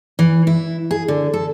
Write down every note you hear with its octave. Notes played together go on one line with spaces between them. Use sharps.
E3
E4
G#4
D3
A4